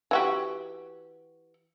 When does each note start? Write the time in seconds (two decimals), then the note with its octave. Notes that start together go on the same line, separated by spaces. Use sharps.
0.11 E3 F#4 G4